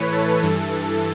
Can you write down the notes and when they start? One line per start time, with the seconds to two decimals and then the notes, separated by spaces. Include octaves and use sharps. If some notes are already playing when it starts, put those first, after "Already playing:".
Already playing: A2 E3 B4 C#5
0.12 A4
0.43 G2 E3